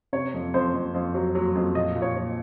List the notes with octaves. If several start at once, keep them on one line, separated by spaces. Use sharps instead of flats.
C3 C#5
F2
F2 C5
F2
F2
F#3
F#3
F2
A#2 D#5
A#2
C#5
F3